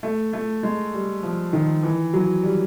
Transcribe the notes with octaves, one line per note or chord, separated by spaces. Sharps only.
A3
A3
G#3
G3
F3
D#3
E3
F#3
G3